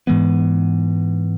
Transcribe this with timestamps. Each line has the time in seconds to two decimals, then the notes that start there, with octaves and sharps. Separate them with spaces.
0.07 G#2 E3 G#3 B3